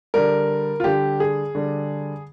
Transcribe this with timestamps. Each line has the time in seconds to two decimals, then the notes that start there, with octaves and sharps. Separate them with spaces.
0.14 D3 G3 A#4
0.80 F4
0.84 D3 G3 G4
1.20 G#4
1.55 D3 G3